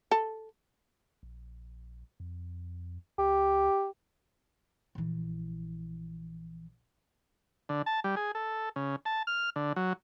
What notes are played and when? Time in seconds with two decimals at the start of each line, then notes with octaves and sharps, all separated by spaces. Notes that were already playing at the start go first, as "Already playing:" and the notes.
0.11 A4
1.23 A#1
2.20 F2
3.18 C#2 G4
4.95 A#1 E3
7.69 D3
7.86 A5
8.04 G3
8.16 G#4
8.35 A4
8.76 C#3
9.05 A5
9.27 F6
9.56 D3
9.76 F#3